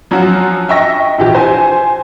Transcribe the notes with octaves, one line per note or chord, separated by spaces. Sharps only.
F3 F#3 C#4 F4 F#4
D#5 E5 G5 C#6 A#6
A#1 E3 G4
C5 G#5